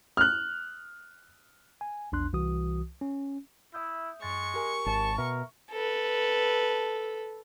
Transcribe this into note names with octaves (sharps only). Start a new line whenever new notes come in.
F6 F#6
G#5
A#1 E2 D4 C6 F#6
C2 E3 F#4 D#6
C#4
E4 E5 D#6 G6
F#2 G#3 C#6 A6
G4 A#4 G#5
G#1 A5
B2 A#4 E5
A4 B4